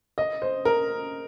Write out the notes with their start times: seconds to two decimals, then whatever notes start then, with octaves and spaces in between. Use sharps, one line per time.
0.18 D#5
0.42 C5
0.65 A#4